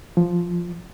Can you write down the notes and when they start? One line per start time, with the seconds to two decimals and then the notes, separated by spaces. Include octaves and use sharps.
0.17 F3